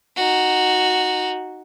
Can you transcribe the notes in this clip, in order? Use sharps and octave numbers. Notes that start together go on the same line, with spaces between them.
D#4 F#4